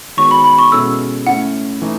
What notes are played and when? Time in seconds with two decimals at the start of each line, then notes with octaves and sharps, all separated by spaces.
0.17 D#3 G#3 B3 F#4 C#5 C#6
0.31 B5
0.44 B5
0.59 C#6
0.72 B2 G#3 C#4 E4 A4 E6
1.27 A3 C#4 E4 F#5
1.82 E3 A3 D#4